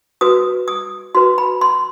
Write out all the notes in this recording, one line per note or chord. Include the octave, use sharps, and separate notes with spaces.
F#4 B4 D#6
D#6
F#4 B4 C6
B5
C6